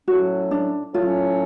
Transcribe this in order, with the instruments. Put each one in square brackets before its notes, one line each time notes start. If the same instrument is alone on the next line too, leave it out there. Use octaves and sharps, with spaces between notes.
[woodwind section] A2 F#3 C#4 [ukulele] F#4
[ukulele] D4
[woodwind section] A2 F#3 C#4 [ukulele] F4